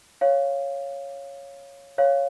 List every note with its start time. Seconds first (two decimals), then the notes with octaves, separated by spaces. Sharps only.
0.21 C#5 F5
1.98 C#5 F5